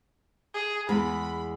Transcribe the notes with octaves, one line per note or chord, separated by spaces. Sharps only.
G#4
E2 G#3 B5